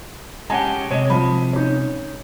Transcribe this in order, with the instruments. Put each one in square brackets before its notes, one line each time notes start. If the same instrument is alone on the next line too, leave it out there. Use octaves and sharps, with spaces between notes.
[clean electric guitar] G#3 C#4 G4 [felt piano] F#5 G#5 A5
[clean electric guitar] C3 G#3 [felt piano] C#5 D#5
[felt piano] F3 B5
C#4 D#4